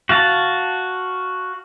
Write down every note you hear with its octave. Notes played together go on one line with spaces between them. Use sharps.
F#4 F5 A5